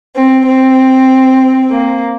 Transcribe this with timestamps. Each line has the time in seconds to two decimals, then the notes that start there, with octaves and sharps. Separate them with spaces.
0.17 C4
0.48 C4
1.70 A#3